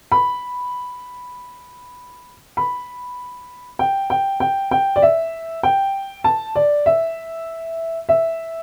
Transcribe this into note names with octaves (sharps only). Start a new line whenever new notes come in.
B5
B5
G5
G5
G5
G5
D5
E5
G5
A5
D5
E5
E5